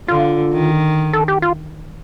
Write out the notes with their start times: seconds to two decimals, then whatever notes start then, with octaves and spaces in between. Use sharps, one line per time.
0.08 D3 F4
0.53 D#3
1.13 A4
1.28 G4
1.42 F4